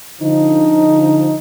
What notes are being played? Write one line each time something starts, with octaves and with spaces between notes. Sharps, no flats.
D3 F3 D#4